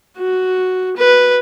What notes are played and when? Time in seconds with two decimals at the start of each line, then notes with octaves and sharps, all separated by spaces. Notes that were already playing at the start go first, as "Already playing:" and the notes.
0.18 F#4
0.97 B4